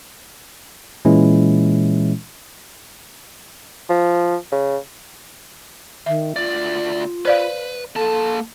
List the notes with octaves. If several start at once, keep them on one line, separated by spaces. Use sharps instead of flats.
A#2 E3 G#3 C#4 E4
F3
C#3
D#3 E5
D2 F4 D5
B4 C5 D5 F5
A#3 A4 A5